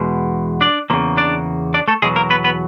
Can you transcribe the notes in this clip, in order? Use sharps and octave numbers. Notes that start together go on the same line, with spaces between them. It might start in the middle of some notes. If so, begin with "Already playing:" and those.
Already playing: E2 B2 G#3
D4 D5
E2 C#3 F3 A#3
D4 D5
D4 D5
A3 A4
E2 B2 F#3 G#3 G#4
A#3 A#4
B3 B4
B3 B4